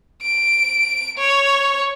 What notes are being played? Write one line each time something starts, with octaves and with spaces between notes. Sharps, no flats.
D7
C#5